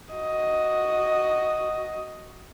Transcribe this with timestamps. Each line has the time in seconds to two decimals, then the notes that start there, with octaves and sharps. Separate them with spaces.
0.14 F#4 D#5